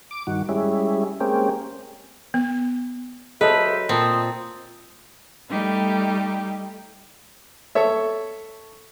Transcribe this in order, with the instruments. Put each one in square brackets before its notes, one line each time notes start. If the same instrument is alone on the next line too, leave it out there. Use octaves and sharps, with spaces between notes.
[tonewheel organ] D6
G2 D#3 F#4
G3 G#3 C#4 E4
G#3 A#3 C4 C#4 G4
[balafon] B3
[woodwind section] C#2 C5 E5 [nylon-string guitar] F#3 [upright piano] A4 D#5 [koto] B4
[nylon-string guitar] A#2 [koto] C4 [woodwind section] G5 A5 D#6
[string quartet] G3 A3 D#4 G4
[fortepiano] A4 C#5 E5